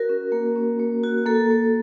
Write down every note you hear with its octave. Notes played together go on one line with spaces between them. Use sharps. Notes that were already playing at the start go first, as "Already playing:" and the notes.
Already playing: F#4 A#4
C#4
A#3
C#4
A#3
F#4
A#3 A4
A#3